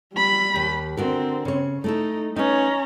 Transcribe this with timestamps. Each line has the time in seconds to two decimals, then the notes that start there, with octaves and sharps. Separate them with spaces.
0.14 G3 B5
0.54 D#2 G4
0.97 D3 C4 F#4 A#4
1.45 C#3 C#5
1.84 A3 D#4 E4 A4
2.36 C#4 D#4 B4 A#5